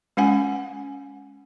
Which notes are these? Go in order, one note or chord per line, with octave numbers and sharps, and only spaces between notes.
G#3 C#4 F#5 G#5